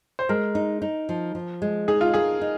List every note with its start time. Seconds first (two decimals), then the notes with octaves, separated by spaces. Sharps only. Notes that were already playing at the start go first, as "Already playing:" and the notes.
0.19 C5
0.29 G#3 A#4
0.55 D#4
0.82 D#4
1.09 F3
1.35 F3
1.62 G#3
1.88 D#4 G#4
2.01 F4
2.14 G#4 A#4
2.41 D#4